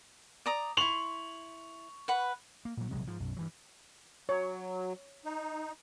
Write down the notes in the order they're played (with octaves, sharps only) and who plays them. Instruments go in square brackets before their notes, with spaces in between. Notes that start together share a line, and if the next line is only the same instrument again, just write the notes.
[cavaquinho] D5 A#5 D#6
[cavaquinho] E4 C6 [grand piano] C#6 F7 F#7
[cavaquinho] B4 F#5 B5
[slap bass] A#3
A#2 F#3
A#1 C3 F#3 G#3
G#2 F3
B1 F#2
G2 E3 F#3
[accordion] F#3 [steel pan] C#5
[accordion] D#4